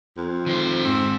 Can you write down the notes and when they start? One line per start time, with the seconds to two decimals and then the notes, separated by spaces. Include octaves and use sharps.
0.17 F2
0.46 D#3 C5
0.85 G#2 C4